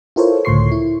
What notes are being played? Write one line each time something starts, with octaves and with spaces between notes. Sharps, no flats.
E4 F4 A4 A#4 C5 C#5
C#2 A2 D3 C6 C#6 C7
E4